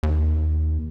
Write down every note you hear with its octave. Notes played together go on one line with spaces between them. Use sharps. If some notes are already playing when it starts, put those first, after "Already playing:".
D#2